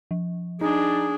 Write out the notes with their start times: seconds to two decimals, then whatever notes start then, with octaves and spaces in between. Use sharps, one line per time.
0.11 F3
0.61 D4 D#4 G#4